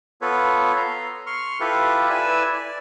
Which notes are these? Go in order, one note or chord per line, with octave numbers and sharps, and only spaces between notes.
B3 F4 A4 B4 C#5
A#5 C6
C6 C#6 F6
E4 F4 G4 A4 B4
E4 B4 D5 G#5 E6
D5